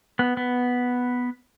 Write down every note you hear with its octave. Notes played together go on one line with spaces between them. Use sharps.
B3
B3